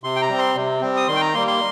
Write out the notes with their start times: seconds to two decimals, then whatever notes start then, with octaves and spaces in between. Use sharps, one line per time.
0.04 C3 C6
0.16 G5
0.21 A#5
0.29 G3 C4
0.38 C6
0.55 C3
0.81 G3 C4
0.97 D#6
1.08 D#3 C6
1.16 G5
1.21 A#5
1.34 G3 A#3 C6
1.48 C6